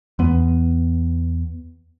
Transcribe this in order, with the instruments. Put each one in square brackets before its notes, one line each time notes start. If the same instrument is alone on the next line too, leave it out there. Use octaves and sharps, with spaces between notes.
[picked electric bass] E2 B3